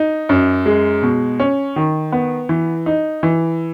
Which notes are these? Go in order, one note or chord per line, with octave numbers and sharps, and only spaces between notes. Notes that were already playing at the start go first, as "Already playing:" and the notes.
Already playing: D#4
F#2
G#3
B2
C#4
D#3
B3
E3
D#4
E3